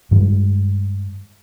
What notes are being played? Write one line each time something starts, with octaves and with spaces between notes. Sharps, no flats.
G2 D#3 G3 G#3